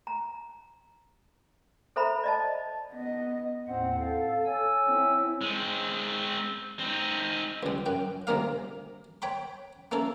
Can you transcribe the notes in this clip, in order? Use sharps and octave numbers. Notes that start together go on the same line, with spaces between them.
A#5
A4 C5 E5 A#5 B5
D5 D#5 A5
B3 D#5
D#2 A2 C4 C5 F#5
A4 F5
C#5 G#5 E6
C4 E4
G#3 C4
C4 D#4
C#2 G3
F#2 G5
D2 C3 G3 A#3 F5
C#5 G5 B5 C6
A#3 C#4 E4 A4